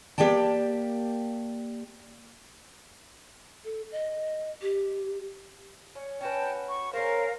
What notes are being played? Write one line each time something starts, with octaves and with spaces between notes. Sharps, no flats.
A#3 G4 D5 G5 A5
A4
D#5
G4
C#4
C#4 F#4 B4 G5 A5
C#6
C#4 G#4 A#4 C5 F5